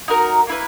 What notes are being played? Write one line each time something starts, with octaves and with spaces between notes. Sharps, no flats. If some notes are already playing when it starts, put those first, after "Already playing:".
D#4 F#4 A#4
A#3 E4 B4